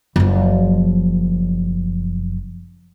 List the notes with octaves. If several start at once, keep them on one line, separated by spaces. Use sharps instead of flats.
F#1 F3